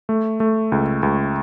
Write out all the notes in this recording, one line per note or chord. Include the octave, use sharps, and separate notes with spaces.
A3
A3
C#2
C#2